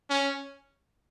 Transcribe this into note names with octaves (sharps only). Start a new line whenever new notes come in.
C#4